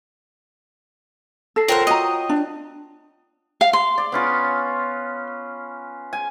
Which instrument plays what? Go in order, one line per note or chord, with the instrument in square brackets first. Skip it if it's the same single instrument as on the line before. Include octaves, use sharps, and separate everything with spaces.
[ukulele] A4 [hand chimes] E6 A#6 C7
[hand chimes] F4 C#5 G5 [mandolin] A#4 C5 F#5
[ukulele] F#4 A#5 [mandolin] D#5
[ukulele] D4
[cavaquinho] F5
C6
[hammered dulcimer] D5
B3 C#4 F4
G#5